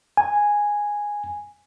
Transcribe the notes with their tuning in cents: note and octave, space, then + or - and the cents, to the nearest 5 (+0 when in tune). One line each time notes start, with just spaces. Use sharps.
G#5 -5